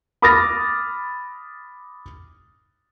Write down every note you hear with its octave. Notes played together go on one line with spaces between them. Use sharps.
B5 D6 D#6 F6 A6 A#6